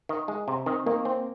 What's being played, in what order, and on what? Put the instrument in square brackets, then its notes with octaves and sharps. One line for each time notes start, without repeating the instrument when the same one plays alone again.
[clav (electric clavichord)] D#3
G#3
C3
[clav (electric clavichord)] D#3 [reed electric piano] C4
[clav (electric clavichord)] D#3 [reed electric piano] A#3
[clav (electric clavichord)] C4